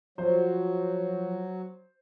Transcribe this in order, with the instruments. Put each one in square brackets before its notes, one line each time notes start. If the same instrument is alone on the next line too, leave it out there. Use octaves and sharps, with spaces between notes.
[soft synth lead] F3 [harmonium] F#3 [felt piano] C5